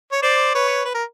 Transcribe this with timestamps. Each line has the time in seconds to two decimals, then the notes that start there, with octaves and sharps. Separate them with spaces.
0.12 C#5
0.22 C5 D5
0.55 B4 C#5
0.85 B4
0.95 A#4